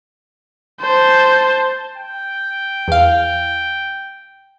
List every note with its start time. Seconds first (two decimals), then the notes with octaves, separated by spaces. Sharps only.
0.82 C5 A5
1.97 G5
2.88 E2 F5